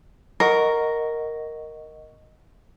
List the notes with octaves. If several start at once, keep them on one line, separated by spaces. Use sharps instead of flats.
A#4 D#5 F#5 C#6